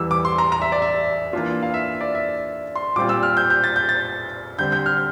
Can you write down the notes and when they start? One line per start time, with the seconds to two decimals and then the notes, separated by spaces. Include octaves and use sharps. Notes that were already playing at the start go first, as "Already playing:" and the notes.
Already playing: E2 E3 G3 E6
0.11 D6
0.25 C6
0.38 A#5
0.52 A#5
0.62 E5
0.72 D5
0.82 E5
1.33 E3 A#3 D4 F4
1.63 F5
1.74 E5
2.01 D5
2.15 E5
2.76 C6
2.96 A#2 G3 C4 F4 D6
3.09 E6
3.23 F6
3.37 G6
3.50 G6
3.64 A6
3.76 G6
3.89 A6
4.58 D3 G3 C4 G6
4.72 G6
4.86 F6